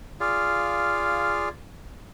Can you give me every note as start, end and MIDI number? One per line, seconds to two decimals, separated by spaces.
0.20 1.49 65
0.20 1.49 68
0.20 1.49 74
0.20 1.49 77